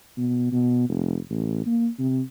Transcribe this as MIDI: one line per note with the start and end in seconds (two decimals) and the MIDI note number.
0.17 0.52 47
0.52 0.86 47
0.89 1.17 29
1.30 1.62 33
1.66 1.88 58
1.99 2.21 48